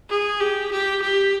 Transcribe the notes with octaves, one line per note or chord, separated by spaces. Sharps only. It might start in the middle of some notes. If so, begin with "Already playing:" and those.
G#4
G4
G4
G4